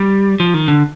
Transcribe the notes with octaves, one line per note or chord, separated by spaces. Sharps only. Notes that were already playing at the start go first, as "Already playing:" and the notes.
Already playing: G3
F3
D#3
D3